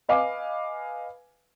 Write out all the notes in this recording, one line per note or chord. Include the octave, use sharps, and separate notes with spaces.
B4 D#5 F5 G#5 D6